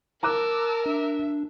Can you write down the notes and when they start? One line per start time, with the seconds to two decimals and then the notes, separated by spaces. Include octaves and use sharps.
0.23 A#4 A5 A#5 D6 E6 F#6
0.86 D4 E5